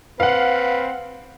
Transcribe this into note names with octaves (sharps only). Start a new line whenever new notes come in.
C4 B4 F5 F#5